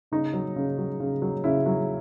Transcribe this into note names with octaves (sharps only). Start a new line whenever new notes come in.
C#3 D#4
F#3
C#3
F#3
C#3
F#3
C#3 E4
F#3